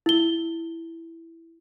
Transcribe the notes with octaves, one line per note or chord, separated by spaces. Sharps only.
E4 G7